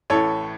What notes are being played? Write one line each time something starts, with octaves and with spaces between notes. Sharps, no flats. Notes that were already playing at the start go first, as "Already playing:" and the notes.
A1 A2 E3 A4 C#5